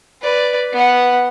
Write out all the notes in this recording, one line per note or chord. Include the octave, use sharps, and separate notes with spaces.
B4 D5
B3 F#5